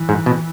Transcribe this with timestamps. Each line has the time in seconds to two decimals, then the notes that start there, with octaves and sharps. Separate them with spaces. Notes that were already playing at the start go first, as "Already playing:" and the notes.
Already playing: E3
0.09 G#2
0.26 B2